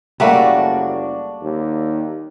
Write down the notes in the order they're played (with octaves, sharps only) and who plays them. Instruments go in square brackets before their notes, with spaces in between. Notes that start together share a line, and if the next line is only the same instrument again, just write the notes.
[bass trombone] F#1 [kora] G3 A3 A#3 [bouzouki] D4 F#4
[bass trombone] D#2